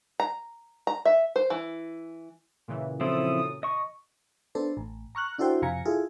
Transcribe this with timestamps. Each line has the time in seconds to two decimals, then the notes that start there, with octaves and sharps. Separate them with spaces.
0.20 A#5
0.87 A#5
1.05 E5
1.36 C5
1.50 E3
2.68 A#2 C#3 E3
3.01 F#2 F3 C4 E4 A4 D#6
3.63 D#5 C#6
4.55 B3 D4 A4 C5
4.77 A1
5.15 A#5 C#6 F6 F#6
5.38 D4 E4 F#4 A4 C5 G5
5.62 F2 C3 F5 G#5 A#5 C#7
5.85 E4 F4 G#4 A4